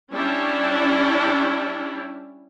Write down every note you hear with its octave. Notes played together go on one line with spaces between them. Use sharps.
G3 C#4 D4 E4